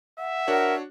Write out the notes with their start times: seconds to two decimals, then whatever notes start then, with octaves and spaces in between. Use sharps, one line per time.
0.19 E5 F#5
0.48 D4 F#4 A#4 C#5